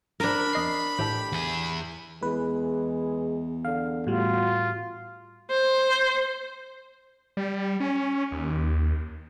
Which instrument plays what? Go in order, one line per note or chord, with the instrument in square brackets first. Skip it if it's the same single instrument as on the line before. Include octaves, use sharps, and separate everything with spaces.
[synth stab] G2 [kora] D4 A#4 [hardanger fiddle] B5
[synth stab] F2 D#5 C7
[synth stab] A1 A2 A4 [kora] G4
[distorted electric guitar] E2 G#4
[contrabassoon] E2 [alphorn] G#3 [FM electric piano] B4
[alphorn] D3 [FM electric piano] F5
[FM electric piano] A2 G3 [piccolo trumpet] F4 [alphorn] F#4
[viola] C5
[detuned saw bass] G3
C#4
D#2